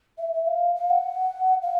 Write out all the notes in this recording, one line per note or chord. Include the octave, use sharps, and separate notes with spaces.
E5
E5
F5
F5
F#5
F5